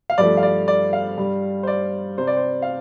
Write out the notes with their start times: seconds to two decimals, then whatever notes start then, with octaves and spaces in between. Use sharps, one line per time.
0.10 F5
0.18 G2 F3 A3 D5
0.37 F5
0.43 D5
0.68 D5
0.93 F5
1.18 G2 G3
1.63 C5
1.67 D5
2.18 C3 G3 C5
2.27 D5
2.37 C5
2.62 F5